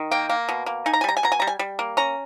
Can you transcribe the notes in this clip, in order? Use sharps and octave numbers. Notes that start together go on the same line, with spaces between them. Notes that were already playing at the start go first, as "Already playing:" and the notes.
Already playing: D#3
A#3 G5
A#3
B2
A#3
D#4 G#5
A#5
G#5
G3 A#5
G#5
B2 A#5
G#5
G3 A#5
G#5
G3
A#3
C#4 A#5